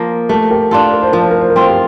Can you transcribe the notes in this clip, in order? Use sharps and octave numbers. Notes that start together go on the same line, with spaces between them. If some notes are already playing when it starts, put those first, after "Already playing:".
Already playing: F3 A#3
A3 G4 A#4
G4 A#4
D4 F4 A4
A#4
C5
F3 A#4
C5
A#4
C5
A#4
C4 F4 C5
G4 A#4